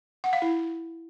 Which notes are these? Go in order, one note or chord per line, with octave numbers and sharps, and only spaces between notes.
F#5
F5
E4